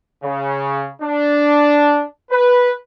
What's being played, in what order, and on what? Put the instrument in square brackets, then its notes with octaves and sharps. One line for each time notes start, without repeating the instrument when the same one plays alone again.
[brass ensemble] C#3
D4
B4